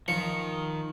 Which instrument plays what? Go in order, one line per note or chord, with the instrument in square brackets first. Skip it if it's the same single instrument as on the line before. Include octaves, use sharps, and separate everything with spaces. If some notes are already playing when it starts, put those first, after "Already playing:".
[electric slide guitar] D#3 [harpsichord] F3 [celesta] C#7